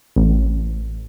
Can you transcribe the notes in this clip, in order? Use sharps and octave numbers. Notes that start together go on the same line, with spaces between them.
A1